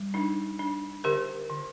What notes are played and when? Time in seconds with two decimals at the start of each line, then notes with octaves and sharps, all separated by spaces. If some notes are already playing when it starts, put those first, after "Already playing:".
Already playing: G3
0.14 D4 D#4
0.59 D4
1.04 D3 G4 A#4
1.50 D3